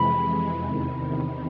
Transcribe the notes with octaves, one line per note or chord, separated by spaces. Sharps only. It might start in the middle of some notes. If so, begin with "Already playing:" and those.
Already playing: F2 C3 E3 G#3 B5
E2 C3 D#3